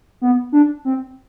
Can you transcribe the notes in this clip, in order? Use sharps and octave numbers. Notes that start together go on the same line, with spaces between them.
B3
D4
C4